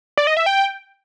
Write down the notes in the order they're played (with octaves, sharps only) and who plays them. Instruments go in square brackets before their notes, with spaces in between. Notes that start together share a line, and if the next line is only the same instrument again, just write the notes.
[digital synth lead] D5
D#5
E5
G5